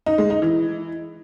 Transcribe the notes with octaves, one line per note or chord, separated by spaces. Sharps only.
D#4
G#3
D#4
E3